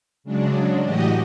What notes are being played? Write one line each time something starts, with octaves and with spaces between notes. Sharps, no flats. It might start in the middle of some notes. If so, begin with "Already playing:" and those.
C#3 F#3 G#3 D4
A2 E3 F#4 G4 D#5